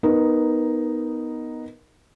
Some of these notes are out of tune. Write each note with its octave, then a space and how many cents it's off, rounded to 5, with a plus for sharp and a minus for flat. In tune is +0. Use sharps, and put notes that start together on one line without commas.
B3 +0 D#4 +0 A#4 +10